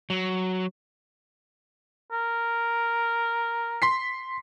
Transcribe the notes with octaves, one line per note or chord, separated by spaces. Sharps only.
F#3
A#4
C6 B6 C7